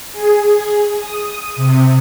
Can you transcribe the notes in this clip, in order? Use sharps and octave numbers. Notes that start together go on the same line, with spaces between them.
G#4
D#6
C3